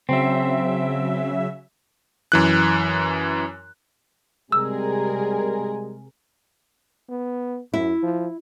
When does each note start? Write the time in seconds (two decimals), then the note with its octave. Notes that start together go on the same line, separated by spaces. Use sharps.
0.09 C#3 F#3 C4 E5
2.32 F#2 E3 F#6
4.52 C3 G3 G#3 G#4 A#4 E6
7.10 B3
7.74 F#2 E4
8.03 F3